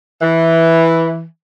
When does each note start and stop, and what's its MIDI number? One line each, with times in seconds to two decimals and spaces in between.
0.22 1.24 52